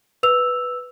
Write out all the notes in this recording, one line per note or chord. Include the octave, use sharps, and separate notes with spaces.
B4 E6 F7